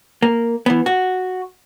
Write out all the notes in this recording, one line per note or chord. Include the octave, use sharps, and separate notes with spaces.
A#3
E3 B3
F#4